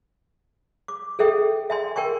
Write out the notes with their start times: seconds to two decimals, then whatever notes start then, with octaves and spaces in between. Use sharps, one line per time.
0.88 D6
1.19 G#4 A4 E5 G5
1.70 E5 G#5 C6
1.96 A#4 G5 G#5 C#6